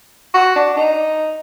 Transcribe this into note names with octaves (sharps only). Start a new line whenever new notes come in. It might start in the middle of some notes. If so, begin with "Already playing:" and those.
F#4
D4
D#4